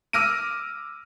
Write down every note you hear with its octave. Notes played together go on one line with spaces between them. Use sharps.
D6 E6 F6 A#6 D7 D#7